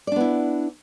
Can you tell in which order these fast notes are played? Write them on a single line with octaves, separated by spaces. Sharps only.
D5 D4 B3 E4